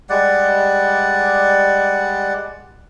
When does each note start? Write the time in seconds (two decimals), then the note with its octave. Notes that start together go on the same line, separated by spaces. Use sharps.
0.10 G3 G#3 D5 F#5